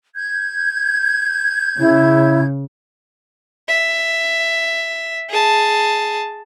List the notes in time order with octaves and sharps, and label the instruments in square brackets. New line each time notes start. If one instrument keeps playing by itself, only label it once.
[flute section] G6 G#6
[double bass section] C#3 [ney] E4
[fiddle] E5
G#4 A5